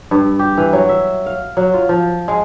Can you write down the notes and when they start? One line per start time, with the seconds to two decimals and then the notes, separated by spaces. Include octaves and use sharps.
0.11 G2
0.39 G4
0.58 E3
0.73 F#3
0.89 E5
1.26 F5
1.57 F#3
1.74 F4
1.89 F3
2.28 G#3